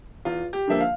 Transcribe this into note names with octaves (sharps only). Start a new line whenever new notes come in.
E2 F4
G4
D3 F3 A#3 E5
F5